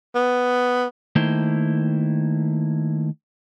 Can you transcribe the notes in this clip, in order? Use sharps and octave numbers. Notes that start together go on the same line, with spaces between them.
B3
D#3 A3 A#3 E4 C5